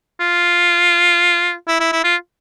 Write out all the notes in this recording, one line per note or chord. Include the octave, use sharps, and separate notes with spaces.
F4
E4
E4
E4
F4